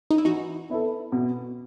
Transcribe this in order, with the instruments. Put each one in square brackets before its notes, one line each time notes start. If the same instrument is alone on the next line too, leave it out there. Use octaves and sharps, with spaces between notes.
[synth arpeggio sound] D#4
E4
[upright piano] E3 [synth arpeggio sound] D#4 F#4
[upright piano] B3 E4 A4
B2